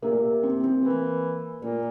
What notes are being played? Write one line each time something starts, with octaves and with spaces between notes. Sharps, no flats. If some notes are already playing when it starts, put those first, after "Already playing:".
C3 A#3
A#2
C3
C4
C4
E3 A#3
A#2 A#3